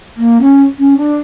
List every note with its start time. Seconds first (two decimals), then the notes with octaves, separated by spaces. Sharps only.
0.17 A#3
0.41 C#4
0.79 C#4
0.97 D4